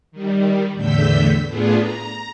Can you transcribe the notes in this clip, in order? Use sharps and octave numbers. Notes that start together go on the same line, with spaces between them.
D#3 G3
E2 A2 D3 E6 G6 B6
A2 A3 B3 D4 F4 G#4
A#5